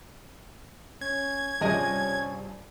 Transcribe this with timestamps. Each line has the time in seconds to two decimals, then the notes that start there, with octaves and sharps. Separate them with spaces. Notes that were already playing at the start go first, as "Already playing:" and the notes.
1.01 C#4 G#6
1.61 G2 C3 F3 C#4 G#4 D#5 G#5